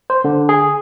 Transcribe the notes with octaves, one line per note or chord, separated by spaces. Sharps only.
C5
D3
G#4